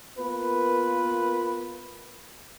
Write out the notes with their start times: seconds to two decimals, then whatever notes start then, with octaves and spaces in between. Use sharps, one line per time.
0.17 A#3 B3 F4 A#4 B4